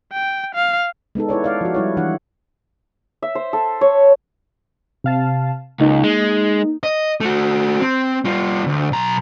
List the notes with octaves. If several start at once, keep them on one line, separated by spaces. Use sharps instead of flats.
G5
F5
G#3 B3 D#4 A4
E4 B4 C#5 D5
D5 F5
F3 F#4
G3 E4 C#5
E3 D4 F#5
E5
C5
A4
C#5
C3 F5 A5
C#2 A#3 D#4
G#3
D#5
A3 F#4
C4
G3 F4
D2
B1 A#5